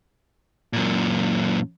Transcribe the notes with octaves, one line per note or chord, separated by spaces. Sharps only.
F#2 A#2